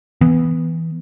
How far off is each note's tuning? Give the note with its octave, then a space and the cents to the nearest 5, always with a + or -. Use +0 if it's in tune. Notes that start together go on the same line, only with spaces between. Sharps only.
E3 -10 B3 +0